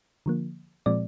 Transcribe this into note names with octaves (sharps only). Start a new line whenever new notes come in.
D3 F3 A#3
A#2 F3 G#3 C4 D5